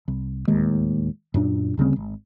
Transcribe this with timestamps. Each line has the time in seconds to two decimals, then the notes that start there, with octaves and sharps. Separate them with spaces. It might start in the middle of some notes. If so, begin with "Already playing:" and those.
0.08 C2
0.48 D1 D#2 G#3
1.34 F#2 A#2 D4
1.77 D2 C#3 G3 C4
1.96 G#1